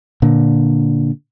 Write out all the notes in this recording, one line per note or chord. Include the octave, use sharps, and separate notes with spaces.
A#2 D3